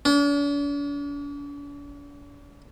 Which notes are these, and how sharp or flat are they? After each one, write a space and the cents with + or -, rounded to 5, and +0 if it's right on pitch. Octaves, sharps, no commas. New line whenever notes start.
D4 -45